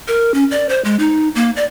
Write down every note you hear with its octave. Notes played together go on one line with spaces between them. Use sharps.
A#4
C#4
D5
C5
G#3
D#4
A#3
D5